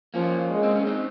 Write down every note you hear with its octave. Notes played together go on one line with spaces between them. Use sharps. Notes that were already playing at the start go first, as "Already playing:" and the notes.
F3 A#3 C#4
G#3
C4
C#4
C4 D#4